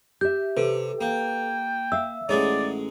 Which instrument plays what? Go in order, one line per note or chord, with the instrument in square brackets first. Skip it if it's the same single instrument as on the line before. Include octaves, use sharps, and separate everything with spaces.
[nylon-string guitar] G4 E5 [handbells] G6
[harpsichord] C3 [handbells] A4 B4
[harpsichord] A#3 [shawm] G5
[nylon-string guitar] E5 F5 [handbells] E6
[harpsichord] A1 G#3 D#4 [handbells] G#4 [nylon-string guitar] C#5 F#5 [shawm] D5